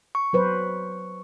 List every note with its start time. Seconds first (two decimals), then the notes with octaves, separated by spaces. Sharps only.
0.15 C#6
0.33 F#3 B4 C5